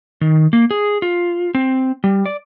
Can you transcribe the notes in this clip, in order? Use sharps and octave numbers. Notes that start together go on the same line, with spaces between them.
D#3
A#3
G#4
F4
C4
G3
D5